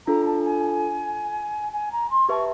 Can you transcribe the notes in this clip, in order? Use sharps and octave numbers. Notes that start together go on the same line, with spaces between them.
D4 F4 A4 A#5
A5
G#5
G#5
A#5
C6
G4 B4 E5 A5 C#6